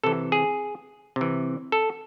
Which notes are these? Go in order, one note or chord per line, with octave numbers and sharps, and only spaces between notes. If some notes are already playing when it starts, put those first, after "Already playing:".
C3 E3 A4
G#4
C3
E3
A4